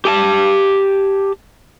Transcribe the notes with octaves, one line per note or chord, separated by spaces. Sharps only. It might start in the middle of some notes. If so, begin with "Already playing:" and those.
G4 G#5 A5